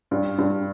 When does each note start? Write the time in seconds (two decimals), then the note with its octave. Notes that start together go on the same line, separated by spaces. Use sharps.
0.11 G2
0.38 G2